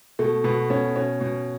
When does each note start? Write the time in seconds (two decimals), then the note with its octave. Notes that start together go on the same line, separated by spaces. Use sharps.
0.19 B2 A3
0.44 B2 B3
0.70 B2 C#4
0.96 B2 C#4
1.21 B2